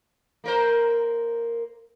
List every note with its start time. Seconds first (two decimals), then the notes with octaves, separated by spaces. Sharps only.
0.44 A#3 A#4 C5